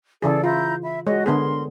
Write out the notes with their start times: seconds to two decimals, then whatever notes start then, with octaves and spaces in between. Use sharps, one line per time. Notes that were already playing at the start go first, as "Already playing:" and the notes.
0.22 C#3 E3 G#4 A4 D5 F5
0.44 E4 F4 A#5 G6
0.83 E5 B5
1.07 G#3 F#4 C#5 D#5
1.26 D3 B3 G#4 A#4 C6